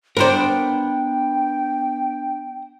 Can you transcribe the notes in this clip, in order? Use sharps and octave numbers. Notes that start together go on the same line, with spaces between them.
B3 D4 A#4 C5 D5 G5